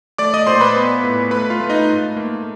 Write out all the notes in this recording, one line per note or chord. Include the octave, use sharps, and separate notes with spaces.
A3 D5 D6
D#5 D#6
A#2 C5 C6
B4 B5
B3
A2
A3 B4 B5
F4 F5
A3
D#4 D#5
G#2
A#3